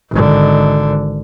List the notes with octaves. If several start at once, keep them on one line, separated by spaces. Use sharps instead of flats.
G#1 D3